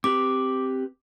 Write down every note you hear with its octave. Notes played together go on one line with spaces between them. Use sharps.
C4 G4 B4 D6